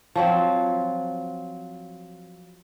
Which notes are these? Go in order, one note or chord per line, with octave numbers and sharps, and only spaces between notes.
F3 F#3 C4